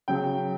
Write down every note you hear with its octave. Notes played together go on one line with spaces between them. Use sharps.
C#3 F#3 G5